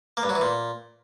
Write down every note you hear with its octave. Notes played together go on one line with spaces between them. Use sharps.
A#3
G2
F#3
E3
A#2